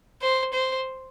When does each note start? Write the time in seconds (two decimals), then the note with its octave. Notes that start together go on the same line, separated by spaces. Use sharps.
0.22 C5
0.53 C5